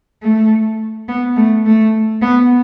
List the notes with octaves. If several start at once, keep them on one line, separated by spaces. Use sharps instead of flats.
A3
B3
A3
A3
B3